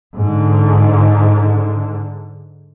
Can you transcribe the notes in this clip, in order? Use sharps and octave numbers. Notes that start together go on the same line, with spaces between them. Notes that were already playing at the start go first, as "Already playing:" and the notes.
G#2 D3